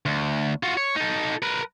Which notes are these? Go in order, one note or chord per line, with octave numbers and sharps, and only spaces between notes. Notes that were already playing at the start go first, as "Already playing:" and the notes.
D2
F4 F#4
C#5
D#4 A4
A#4 B4